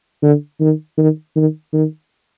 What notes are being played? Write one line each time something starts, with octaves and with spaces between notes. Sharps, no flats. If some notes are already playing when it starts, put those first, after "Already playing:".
D3
D#3
D#3
D#3
D#3